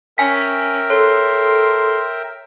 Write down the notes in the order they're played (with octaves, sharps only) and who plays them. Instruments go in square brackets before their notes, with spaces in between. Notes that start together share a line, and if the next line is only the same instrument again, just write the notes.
[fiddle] C#4 [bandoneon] A#4 E5 G5 [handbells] G#5 B6
[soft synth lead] A4 [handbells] C#5 [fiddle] C6